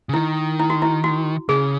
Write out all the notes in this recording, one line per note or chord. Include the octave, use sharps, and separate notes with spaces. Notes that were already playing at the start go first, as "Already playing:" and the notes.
C#3
D#3 E4
E4
F#4
E4
F#4
C#3 G#4